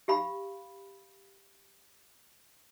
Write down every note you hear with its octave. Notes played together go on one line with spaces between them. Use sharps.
G4 F5 B5